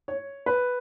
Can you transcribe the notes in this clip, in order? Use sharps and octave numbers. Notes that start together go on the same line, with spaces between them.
C#5
B4